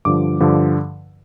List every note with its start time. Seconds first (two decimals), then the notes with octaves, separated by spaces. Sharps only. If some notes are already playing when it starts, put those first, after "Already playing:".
0.05 G2 D3 F3 D6
0.40 G2 D3 F3